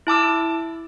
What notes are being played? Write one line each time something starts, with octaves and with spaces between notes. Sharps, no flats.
E4 A5 D6 E6